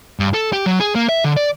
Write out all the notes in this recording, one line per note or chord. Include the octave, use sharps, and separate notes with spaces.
G2
A4
G4
F#3
G#4
A#3
E5
D3
D5